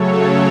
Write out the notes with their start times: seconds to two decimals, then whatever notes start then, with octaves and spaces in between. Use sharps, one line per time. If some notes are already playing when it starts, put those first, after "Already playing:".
Already playing: C#3 F#3 A3 A4 C#5
0.18 A4 C#5